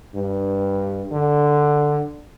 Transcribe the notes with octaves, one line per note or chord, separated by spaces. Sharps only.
G2
D3